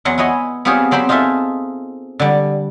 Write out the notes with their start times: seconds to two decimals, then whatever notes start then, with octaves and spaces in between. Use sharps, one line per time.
0.05 E2 F#3 F#5 C6
0.18 E4 B4 C#5 D#5 G#5
0.65 B3 C4 F4 G4 G#4 C#5
0.91 F#3 C4 G4 C5 B5
1.09 D#4 F4 G#4 A4 E5
2.19 D3 G3